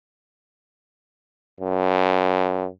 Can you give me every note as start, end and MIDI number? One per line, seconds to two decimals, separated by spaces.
1.60 2.68 42